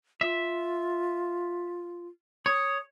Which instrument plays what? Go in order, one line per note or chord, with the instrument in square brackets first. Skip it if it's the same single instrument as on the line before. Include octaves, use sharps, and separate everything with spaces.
[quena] F4 [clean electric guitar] E5
[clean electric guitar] C#5 [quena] D#6